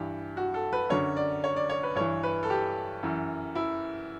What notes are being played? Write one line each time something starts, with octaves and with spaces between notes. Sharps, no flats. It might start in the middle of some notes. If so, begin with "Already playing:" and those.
Already playing: G2 E3 G4
F#4
A4
B4
F#2 D3 C#5
D5
C#5
D5
C#5
B4
G2 E3 C#5
B4
A4
G4
F#2 E3
E4